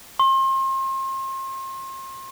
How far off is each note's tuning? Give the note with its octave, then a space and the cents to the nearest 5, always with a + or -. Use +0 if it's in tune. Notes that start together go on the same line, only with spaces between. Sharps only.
C6 +35